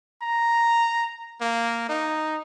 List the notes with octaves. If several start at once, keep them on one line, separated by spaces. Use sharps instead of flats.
A#5
A#3
D#4